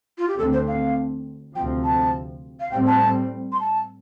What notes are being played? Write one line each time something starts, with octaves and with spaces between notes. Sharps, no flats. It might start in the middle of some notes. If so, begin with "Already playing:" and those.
F4
G4
D2 D3 A3 C4 A4
C5
F5
D2 C3 F3 C4 G5
A5
F5
A2 G3 C4 G5
A5
C6
A5